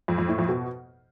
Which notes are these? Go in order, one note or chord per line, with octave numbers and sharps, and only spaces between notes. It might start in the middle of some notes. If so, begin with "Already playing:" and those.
F2
F2
A2
F2
B2